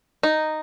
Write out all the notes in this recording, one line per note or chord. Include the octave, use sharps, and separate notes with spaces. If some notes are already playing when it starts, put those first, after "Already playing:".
D#4